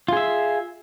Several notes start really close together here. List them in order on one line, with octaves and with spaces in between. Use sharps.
F4 G#4 E5